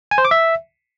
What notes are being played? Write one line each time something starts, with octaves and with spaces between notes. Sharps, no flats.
G#5
C5
D6
E5